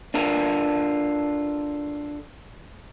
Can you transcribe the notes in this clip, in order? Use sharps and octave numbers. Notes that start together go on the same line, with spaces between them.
D4 F4 A4 A#4